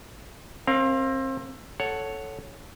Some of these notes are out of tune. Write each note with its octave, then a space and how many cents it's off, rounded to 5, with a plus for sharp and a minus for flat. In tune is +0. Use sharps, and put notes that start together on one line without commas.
C4 +30 A#4 +0 F5 +0
A4 +0 C#5 +0 F#5 +0